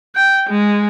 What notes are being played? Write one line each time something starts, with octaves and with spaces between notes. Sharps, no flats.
G5
G#3